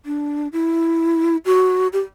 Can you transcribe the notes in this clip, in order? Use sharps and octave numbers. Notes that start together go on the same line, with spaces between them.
D4
E4
F#4
G4